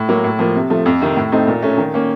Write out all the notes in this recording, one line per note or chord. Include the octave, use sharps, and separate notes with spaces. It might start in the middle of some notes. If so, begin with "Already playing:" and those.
Already playing: A2
F#3 A#3
A2
F3 A#3
C3
F3 A3
F2
C3 D#3
A2
A3 C4 D#4
A#2
A3 C#4
D#3
A#3 C#4